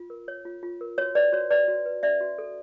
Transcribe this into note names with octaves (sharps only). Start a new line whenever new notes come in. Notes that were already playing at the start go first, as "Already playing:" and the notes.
Already playing: F4
A#4
C#5
F4
F4
A#4
F#4 C#5
B4 D5
F#4 C#5
B4 D5
F#4
B4
C#4 D5 E5
F#4
A4